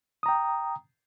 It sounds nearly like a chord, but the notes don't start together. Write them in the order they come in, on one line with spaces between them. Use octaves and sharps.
D#6 A#5 G5